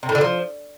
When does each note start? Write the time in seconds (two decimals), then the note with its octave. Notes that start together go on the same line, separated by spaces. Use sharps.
0.03 C3
0.09 A2
0.15 D3
0.21 F3